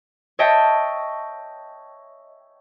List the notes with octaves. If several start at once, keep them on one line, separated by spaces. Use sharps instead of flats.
C#5 D#5 E5 G5 A5